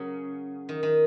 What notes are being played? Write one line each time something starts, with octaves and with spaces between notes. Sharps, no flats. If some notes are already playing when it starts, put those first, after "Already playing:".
Already playing: C#3 F#3 G#4 A#4
D#3
D#3